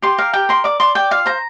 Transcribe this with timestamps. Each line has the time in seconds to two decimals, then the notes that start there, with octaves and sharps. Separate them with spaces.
0.02 G4 C6
0.18 A#4 F5
0.33 G4 G5
0.49 A#4 C6
0.64 D5 D6
0.80 D5 C6
0.95 D5 G5
1.11 F4 F5
1.26 C5 A#5